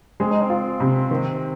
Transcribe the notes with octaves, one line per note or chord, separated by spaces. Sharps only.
G#3 C4
D#4
C4
F4
C3
D#3